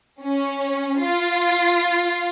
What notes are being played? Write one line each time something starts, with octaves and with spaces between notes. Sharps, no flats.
C#4
F4